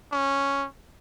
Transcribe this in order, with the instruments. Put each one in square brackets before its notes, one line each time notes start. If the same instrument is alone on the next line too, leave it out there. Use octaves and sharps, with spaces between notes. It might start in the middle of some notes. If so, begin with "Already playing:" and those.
[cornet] C#4